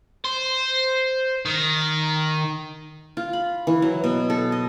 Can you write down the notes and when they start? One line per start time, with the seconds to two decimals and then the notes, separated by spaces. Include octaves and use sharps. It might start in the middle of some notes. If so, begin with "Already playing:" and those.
0.25 C5
1.45 D#3
3.17 F4
3.33 B5
3.67 E3
3.82 F#3
4.04 B2
4.30 A4
4.52 D#5